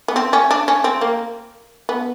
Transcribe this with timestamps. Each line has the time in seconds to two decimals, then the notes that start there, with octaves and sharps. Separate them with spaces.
0.08 B3
0.16 C4
0.33 C#4
0.51 D4
0.68 C#4
0.84 C4
1.01 A#3
1.89 B3